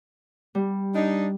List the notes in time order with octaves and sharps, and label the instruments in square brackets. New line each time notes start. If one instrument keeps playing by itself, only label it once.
[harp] G3
[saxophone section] D4 D#4